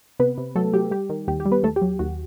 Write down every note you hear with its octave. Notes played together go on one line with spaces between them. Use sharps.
C3 B3 B4
C3
F#3 A3 A4
F#3 G4
G3 G4
D#3
D#2 G4
G4
G3
B3 B4
D#2 A3 A4
G4
F#3
D#2 F#4